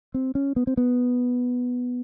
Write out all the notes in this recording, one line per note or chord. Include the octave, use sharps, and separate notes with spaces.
C4
C#4
B3
C4
B3